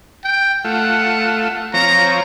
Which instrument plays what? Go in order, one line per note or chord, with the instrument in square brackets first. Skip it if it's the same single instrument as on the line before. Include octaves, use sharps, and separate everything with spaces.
[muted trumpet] G5
[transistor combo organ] A3 F4 [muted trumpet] F#5
[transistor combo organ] F3 C4 C#5 [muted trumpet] A#5